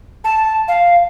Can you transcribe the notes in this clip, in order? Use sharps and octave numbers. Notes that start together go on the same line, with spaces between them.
A5
F5